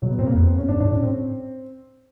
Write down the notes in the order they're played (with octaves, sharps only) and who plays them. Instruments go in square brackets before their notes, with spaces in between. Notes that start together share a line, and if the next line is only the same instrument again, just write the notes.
[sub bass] B2 [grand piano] F#3
[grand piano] B3
[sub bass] A2 [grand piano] C4
[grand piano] A#3
[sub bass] F2 [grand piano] B3
[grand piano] C4
C#4
[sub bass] G2 [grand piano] D4
[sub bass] G#2 [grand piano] D4
[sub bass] A2 [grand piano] C#4
[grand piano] C4